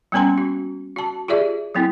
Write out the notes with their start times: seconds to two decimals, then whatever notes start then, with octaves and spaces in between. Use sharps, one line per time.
0.12 G3 A#3 B3 C#4 A#5 C6
0.38 F#4
0.96 F#4 A5
1.28 F4 G4 G#4 D5 E5
1.75 F#3 A#3 C4 E4